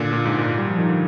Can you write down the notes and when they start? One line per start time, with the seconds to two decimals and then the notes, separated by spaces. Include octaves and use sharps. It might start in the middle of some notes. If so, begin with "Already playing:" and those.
Already playing: A#2 D3
0.13 A#2
0.25 G#2
0.38 A#2
0.58 G3
0.68 F3
0.79 D#3
0.89 D3